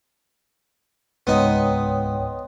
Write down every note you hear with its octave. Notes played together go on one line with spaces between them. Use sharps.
C#2 G#2 B3 D#4 C#5 G5 C6